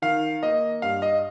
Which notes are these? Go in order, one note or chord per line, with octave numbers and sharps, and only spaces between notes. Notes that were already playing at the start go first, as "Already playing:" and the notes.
D#3 F5
A#3 D#5
G2 F5
D#5